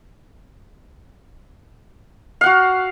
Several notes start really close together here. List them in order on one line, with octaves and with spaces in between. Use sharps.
F5 F#5 F#4